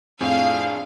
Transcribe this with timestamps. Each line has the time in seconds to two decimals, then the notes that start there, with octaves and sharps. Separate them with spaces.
0.21 F2 A2 C4 D4 G#4 F5